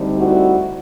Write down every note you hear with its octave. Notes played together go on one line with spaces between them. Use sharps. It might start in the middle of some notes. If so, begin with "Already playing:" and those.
Already playing: D2 D3 G3 C4 D#4
E4 F#4